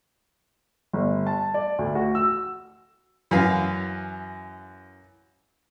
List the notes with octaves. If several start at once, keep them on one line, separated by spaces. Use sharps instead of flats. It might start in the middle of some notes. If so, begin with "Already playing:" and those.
G1
A5
D5
D2
F#4
E6
F#2 E3 F5